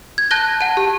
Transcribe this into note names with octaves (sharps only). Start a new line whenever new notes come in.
G#6
A5 F#6 G6 A#6 G7
F#5 A5
G4